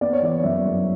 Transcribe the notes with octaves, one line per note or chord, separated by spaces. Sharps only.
B3 D5
C#5
E3 D5
F#2 E5
F#2